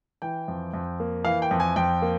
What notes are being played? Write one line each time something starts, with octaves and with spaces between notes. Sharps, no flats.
E3 G5
F2
F2
A#3
E3 F5
G5
F2
G#5
F2 G5
A#3